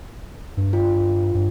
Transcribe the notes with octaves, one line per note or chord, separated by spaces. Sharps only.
G2
F4
G2